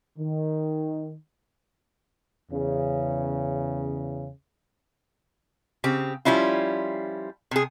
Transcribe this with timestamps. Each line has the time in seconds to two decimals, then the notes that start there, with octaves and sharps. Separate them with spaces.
0.19 D#3
2.52 E2 C#3
5.84 C#3 C4 G4
6.25 F3 G3 C#4 E4 F4
7.51 C3 G#4